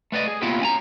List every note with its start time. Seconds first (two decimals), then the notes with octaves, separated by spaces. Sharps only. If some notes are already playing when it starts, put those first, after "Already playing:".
0.12 A3 B4 D5 D#5
0.27 G#4
0.42 A#3 B3 E4 F4 G4 B4
0.61 C#4 G#5 A#5